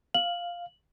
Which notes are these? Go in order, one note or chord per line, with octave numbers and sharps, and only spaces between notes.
F5 F#7